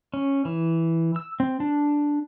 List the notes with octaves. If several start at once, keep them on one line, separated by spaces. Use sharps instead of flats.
C#4
E3
E6
C4
D4